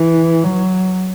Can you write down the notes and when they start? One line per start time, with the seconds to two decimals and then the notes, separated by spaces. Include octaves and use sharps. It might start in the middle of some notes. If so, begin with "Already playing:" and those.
Already playing: E3
0.44 F#3